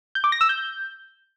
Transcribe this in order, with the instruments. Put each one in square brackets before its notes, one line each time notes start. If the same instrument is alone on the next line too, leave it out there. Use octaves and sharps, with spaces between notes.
[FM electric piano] G6
D6
A#6
E6
G6